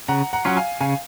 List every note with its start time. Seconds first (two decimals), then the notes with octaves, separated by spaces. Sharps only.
0.08 C#3 F#5 A#5
0.33 F#5 A#5
0.45 F#3 C#4 F4 F#5
0.57 F5 G#5
0.81 C#3 F5 G#5